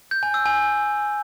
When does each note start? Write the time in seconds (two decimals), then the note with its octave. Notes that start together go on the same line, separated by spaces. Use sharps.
0.11 G6
0.23 G#5
0.34 E6
0.46 G#5